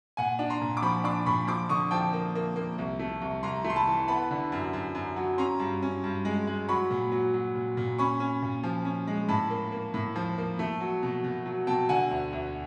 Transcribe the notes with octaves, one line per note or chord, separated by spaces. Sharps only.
A#2 F#5 G#5
D4
A#5 C6
A#2
D6
F3 B5 C#6
D4 C6 D6
A#2 B5 C#6
F3 C6 D6
D3 C#6 D#6
F3 G5 A5
A#3
A#3
A#3
C2
A3
C2
C2 A#5 C6
A3
C6
A5 B5
E3
B3 A5 B5
D3
F#2
F#2
F#2
F#3
C#4 A#5 C6
G2
C#4
G2
G#3
G#3
F#3 B5 C#6
A#2
F#3
F#3
A#2
A#2
C#4 B5 C#6
C#4
A#2
F3
C#4
G#3
A2 A5 B5
A#3
A#3
A2
F3
A#3
A3
F#3
B2
B2
F#3
B2 G5 A5
D3 F#5 G#5
D2
D2